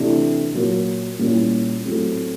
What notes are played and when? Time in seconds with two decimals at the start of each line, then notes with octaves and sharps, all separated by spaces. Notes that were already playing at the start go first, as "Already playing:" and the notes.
Already playing: C3 E3 A3 D4
0.54 A#2 F#3 A#3
1.19 A#2 G3 A#3 C#4 E4
1.84 A2 F#3 A3 C4 F4